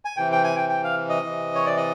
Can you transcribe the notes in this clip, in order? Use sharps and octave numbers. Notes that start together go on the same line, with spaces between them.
G#5
C3 E3 G5
G5
G#5
G5
G5
F5
D#5
C3 E3
C#5
D5
D#5